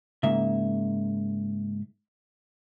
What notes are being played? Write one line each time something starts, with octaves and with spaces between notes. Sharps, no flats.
G#2 C#3 A#3 E5